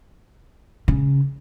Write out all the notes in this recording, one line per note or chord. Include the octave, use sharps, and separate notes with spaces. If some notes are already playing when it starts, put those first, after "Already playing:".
C#3